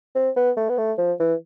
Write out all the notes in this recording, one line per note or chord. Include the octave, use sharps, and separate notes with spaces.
C4
B3
A3
B3
A3
F3
E3